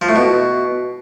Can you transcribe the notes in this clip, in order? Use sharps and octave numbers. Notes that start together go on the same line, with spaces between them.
F3
A2
B2